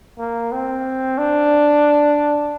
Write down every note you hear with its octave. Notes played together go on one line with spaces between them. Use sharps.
A#3
C4
D4